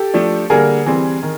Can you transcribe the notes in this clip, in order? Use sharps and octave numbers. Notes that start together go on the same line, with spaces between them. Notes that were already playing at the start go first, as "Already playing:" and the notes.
Already playing: G4 A4
F3 A3 D4
D3 G3 A#3 G#4 A#4
E3 G3 C4
D#3